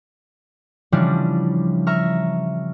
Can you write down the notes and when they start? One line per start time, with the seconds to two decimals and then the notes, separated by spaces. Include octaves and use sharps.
0.92 C#3 E3 F3 G3 C#4 D4
1.87 E5 A#5 C#6 F6